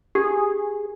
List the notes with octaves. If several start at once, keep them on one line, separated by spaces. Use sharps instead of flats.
G4 G#4